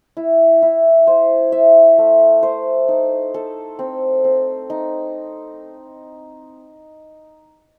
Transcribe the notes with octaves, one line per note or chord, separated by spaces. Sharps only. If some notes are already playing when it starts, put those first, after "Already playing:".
E4
E4
C5
E5
A3
C5
D#4
A4
C4
C4
D#4